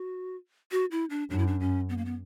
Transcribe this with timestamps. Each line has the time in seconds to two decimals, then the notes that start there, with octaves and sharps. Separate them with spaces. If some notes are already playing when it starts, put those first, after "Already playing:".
Already playing: F#4
0.72 F#4
0.91 E4
1.10 D4
1.30 F#2 D4
1.38 E4
1.47 D4
1.60 C#4
1.89 B3
1.97 A#3
2.05 B3